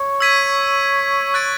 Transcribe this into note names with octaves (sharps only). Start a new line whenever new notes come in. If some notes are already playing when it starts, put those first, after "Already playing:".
Already playing: C#5
E6 G#6 B6 D#7
F#6 A6 D7